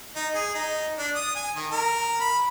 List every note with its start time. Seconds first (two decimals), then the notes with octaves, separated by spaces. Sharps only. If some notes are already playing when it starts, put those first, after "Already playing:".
0.16 D#4
0.35 G#4
0.55 D#4
0.98 D4
1.15 D#6
1.36 G#5
1.55 D#3
1.71 A#4
2.20 B5